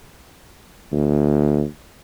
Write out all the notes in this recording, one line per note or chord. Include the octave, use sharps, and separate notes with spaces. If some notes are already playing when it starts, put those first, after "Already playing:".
D2